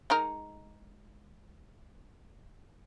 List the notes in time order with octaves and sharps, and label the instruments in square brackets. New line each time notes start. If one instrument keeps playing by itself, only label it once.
[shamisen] G#3 D#4 A#4